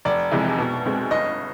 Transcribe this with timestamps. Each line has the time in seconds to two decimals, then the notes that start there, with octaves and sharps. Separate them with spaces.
0.05 F1 D5
0.32 F2 C3 E3 G#3
0.58 B2
0.86 G#3 C4
1.11 G1 D#5